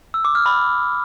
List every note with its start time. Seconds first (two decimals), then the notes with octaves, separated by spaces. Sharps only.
0.14 E6
0.25 D6
0.35 F6
0.46 B5